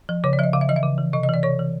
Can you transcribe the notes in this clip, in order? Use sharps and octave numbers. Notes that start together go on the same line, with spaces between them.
F3
C#3 C#5
D5
F3 D#5 E5
C#3 F5
E5
E3 D#5
E5
C#3
E3
C3 D#5
D#5
E3
D5
C3 C#5
E3